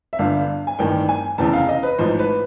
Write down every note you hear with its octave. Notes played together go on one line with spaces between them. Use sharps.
E5
G1 G2 D3 F5
G#5
A1 G2 D#3 G5
G#5
F1 E2 C#3 A5
F5
D#5
B4
A1 G#2 F3 C5
B4